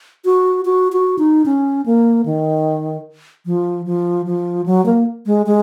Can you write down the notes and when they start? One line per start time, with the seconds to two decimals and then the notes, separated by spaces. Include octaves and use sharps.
0.25 F#4
0.65 F#4
0.92 F#4
1.19 D#4
1.46 C#4
1.86 A#3
2.26 D#3
3.46 F3
3.86 F3
4.26 F3
4.66 F#3
4.86 A#3
5.26 G#3
5.46 G#3